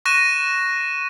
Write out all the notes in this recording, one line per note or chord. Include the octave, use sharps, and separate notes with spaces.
C#6 F#6 A#6 D#7 E7